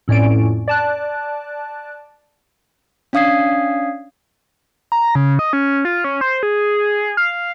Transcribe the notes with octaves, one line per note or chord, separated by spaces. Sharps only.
F2 A2 C#4 D5 D7
D5 A5 F#6
C#4 D4 F5 D#6 G#6 C7
A#5
C#3
D#5
C#4
F4
C#4
C5
G#4
F5